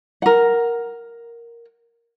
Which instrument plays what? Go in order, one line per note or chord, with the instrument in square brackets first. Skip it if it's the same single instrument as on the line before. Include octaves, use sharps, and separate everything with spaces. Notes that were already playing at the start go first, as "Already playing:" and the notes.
[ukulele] A#4 F#5